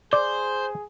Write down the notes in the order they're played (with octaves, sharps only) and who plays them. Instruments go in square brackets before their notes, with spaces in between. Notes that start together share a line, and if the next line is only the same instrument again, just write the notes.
[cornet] G#4 [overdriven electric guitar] C5 [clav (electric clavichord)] D5